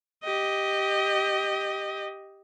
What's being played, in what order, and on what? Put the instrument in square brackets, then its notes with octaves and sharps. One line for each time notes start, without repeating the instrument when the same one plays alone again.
[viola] G4 D#5